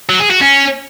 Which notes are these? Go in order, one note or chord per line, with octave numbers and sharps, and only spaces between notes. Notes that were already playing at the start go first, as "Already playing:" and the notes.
F#3
G#4
F#4
C#4